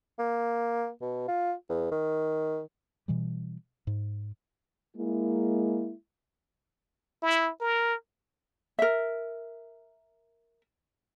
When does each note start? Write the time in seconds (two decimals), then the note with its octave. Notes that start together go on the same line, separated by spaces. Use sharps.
0.19 A#3
1.02 B2
1.28 F4
1.69 E2
1.91 D#3
3.08 B2 E3 G3
3.87 G#2
4.97 G#3 A#3 E4
7.23 E4
7.61 A#4
8.79 A#4 E5